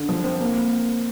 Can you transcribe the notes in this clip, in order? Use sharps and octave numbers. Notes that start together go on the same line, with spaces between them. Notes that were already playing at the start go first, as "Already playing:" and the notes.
Already playing: D3
F3
C4
A#3